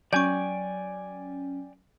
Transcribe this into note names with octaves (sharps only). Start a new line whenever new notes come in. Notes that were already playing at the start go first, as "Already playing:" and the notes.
F#3 C#4 D5 G5 G#5 C#6 G6